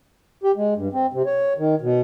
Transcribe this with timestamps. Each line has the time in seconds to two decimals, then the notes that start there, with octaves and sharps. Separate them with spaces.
0.44 G4
0.57 G#3
0.77 G2
0.93 C4
1.13 C3
1.26 C#5
1.58 D#3
1.81 B2